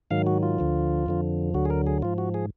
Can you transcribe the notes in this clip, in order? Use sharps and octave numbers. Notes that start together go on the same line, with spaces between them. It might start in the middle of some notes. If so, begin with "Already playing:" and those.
G#2 D#3 F#3 F5
F#4
F4
D2 D3 F3
F2 D3 F3
D2 D3 F#3 F#4
G#4
A#4
G#4
G#2 F3 F4
F#4
G#4